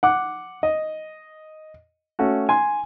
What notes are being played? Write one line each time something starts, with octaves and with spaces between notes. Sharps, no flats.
F#5 D6
D#5
A3 C#4 F#4
G#5 C6